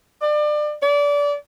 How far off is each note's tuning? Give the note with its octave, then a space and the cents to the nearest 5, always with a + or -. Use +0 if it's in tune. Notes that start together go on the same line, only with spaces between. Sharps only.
D5 +30
D5 -25